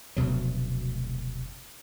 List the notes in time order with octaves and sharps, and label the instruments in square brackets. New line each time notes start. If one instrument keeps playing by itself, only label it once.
[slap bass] F1 D2 B2 F#3